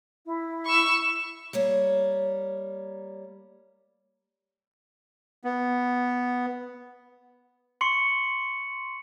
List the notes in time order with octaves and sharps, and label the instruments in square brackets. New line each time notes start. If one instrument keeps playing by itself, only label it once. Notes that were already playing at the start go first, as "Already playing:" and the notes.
[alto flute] E4
[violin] C#6 E6
[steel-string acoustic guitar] G3 A#3 C#5
[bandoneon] B3
[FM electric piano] C6 [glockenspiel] C#6 C#7 F#7